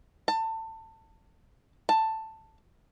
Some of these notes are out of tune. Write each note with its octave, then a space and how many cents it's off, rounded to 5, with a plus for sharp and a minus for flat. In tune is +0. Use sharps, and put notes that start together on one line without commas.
A5 +25
A5 +10